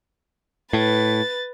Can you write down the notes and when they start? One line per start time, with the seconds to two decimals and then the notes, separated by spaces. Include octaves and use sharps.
0.73 A2 B4 A6